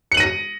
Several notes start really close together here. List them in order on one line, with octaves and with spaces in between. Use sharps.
C#7 F#7 D#7 A#6